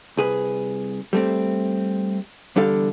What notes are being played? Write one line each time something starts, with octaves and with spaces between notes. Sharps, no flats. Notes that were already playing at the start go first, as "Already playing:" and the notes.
C2 G#4 B4
G3 A3 C4
E2 D3 G3 A4 F5